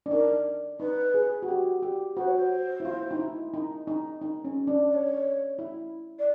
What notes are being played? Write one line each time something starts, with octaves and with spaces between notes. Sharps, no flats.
D4
D#4 A#4
D#4 B4
G#4
F#4
G4
G4
F#4 C5
C#5
C5
E4
F4
D#4
E4
D#4
D#4
D#4
C#4
D4
D5
C#5
E4
D5